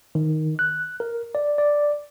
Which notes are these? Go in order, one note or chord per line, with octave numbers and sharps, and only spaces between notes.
D#3
F#6
A#4
D5
D5